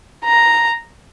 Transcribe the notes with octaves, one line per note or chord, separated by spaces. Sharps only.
A#5